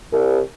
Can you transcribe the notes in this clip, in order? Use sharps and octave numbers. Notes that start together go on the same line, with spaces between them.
C2